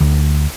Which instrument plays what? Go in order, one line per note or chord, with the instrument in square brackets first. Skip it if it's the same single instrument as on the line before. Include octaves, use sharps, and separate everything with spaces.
[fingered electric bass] D2